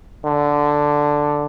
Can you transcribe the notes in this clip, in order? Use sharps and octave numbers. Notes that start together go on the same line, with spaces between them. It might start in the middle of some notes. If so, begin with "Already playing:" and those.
D3